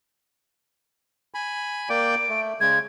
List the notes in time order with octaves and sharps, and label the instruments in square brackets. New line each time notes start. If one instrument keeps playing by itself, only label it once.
[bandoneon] G#5 B5
[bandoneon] A#3 D5 G5 [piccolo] D7
[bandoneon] A3
[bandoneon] C#3 G#3 [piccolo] G#6